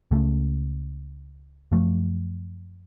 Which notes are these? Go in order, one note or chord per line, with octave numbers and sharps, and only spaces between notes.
C#2 C#3 A3
F#2 F3 A3